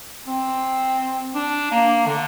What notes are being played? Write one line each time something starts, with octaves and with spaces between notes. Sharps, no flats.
C4
D4
A#3
D3